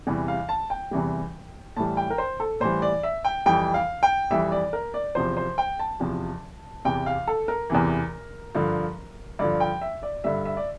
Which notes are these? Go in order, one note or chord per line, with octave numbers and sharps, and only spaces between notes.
E2 C3 E3 G3
F5
A5
G5
E2 C3 E3 G3
A2 E3 G3 A5
G5
A#4
C5
A4
A2 E3 G3 C5
D5
E5
G5
F2 E3 G3 G5
F5
G5
F2 E3 G3 E5
D5
A#4
D5
E2 C3 F3 C5
C5
G5
A5
E2 C3 F3
E2 C3 E3 G5
F5
A4
A#4
E2 C3 E3
G2 D3 F3
G2 D3 F3 D5
G5
E5
D5
G2 D3 G3 E5
E5
D5